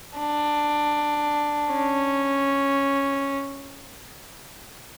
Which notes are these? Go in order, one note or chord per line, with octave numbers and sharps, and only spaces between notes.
D4
C#4